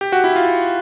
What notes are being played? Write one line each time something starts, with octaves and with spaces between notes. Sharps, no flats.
G4
F#4
E4
F4